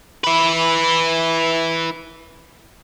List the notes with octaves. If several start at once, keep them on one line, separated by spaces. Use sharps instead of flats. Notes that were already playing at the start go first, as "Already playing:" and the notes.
E4 B4